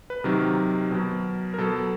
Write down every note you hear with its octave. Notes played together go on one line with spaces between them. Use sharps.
B4
C3 D#3 F#3 A#4
B2 F#3
A#4
B2 F#3 A4